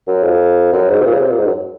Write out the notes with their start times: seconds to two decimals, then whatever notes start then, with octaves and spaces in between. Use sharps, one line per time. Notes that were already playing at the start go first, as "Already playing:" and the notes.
0.07 F#2
0.23 F2
0.73 F#2
0.89 G#2
1.01 C3
1.06 A#2
1.13 C#3
1.21 C3
1.31 A#2
1.38 G#2
1.46 F#2